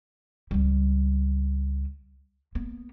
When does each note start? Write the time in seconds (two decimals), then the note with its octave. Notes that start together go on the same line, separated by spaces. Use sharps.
0.51 C#2 G3
2.55 A#3 B3